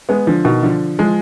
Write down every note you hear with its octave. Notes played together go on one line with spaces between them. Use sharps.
G#3 B3
D3 F3
B2 D#3
D3 F3
F3 G#3